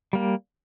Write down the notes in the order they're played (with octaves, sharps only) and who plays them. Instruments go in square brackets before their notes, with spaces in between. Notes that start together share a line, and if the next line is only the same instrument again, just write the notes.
[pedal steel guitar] G3 A#3